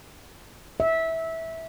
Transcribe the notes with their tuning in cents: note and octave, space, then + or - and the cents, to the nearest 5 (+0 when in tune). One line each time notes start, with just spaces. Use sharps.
E5 -15